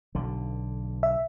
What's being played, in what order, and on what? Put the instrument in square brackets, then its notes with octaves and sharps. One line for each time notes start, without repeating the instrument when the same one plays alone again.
[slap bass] B1 D3
[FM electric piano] E5